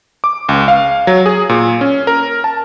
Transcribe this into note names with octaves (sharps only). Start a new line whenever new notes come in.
D6
C#2
F5
F#3
G#4
A#2
C#4
A#4
A5